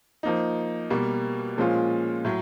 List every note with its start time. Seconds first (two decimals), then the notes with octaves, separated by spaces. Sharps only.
0.23 F3 A#3 D#4
0.90 B2 G3 A#3
1.58 A#2 F3 G#3 C#4 F4
2.25 A2 F#3